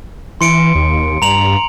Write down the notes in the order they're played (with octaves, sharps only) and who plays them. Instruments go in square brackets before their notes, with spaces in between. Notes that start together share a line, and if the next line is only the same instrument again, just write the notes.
[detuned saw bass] E3 [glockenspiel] C6 C#7 D7
[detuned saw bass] D#2
[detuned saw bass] G2 [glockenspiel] A#5 F7 F#7